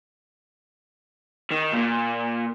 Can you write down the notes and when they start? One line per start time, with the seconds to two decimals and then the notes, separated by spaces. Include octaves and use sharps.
1.51 D#3
1.73 A#2